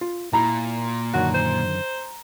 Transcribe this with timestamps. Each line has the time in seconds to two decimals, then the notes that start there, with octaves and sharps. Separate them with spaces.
0.01 F4
0.33 A#2 E4 A#5 B5
1.14 F#2 D3 D#3 F#4
1.35 C5